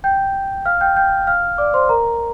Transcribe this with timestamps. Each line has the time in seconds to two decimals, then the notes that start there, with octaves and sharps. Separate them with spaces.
0.04 G5 G6
0.65 F5 F6
0.81 G5 G6
0.96 G5 G6
1.27 F5 F6
1.58 D5 D6
1.74 C5 C6
1.89 A#4 A#5